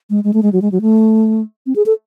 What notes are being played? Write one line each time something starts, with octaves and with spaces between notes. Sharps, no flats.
G#3
G#3
A3
G#3
F#3
G#3
F#3
A3
C4
G#4
A4